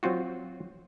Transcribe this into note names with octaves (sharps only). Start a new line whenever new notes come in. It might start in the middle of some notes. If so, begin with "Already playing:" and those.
F#3 C4 F4 F#4